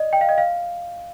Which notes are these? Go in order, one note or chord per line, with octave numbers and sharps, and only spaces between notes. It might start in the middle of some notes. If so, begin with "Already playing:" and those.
Already playing: D5 D#5
G5
F5
D#5
F5